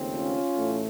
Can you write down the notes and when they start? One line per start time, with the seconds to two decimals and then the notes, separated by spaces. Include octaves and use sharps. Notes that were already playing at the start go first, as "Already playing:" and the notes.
Already playing: D#2 C#3 F3 A3 C4
0.17 C#4 F4
0.55 A1 A2 A3